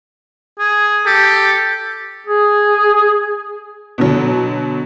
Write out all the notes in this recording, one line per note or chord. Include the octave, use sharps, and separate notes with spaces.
G#4
G4 A4
G#4
B2 D3 F#3